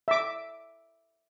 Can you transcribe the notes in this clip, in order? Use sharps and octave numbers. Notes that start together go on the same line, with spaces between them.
E5 D6